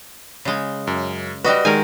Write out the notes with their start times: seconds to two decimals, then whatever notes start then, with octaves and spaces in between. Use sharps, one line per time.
0.45 C#3 G#3
0.87 F#2
1.44 G3 F#4 B4 D#5
1.65 D#3 G#3 A#4 G#5